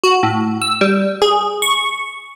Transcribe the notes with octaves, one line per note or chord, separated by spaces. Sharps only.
F#4
A2
E6
G3
G#4
C#6